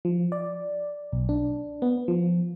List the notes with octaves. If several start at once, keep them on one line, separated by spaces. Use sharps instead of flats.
F3
D5
B1
D4
B3
F3